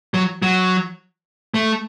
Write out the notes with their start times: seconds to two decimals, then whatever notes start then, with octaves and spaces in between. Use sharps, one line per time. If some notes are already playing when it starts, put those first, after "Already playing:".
0.14 F#3
0.42 F#3
1.54 A3